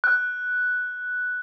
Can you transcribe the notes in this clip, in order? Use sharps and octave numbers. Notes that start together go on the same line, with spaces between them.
F#6